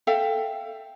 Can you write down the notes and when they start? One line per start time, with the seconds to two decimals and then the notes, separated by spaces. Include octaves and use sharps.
0.07 A4 E5 F5 G5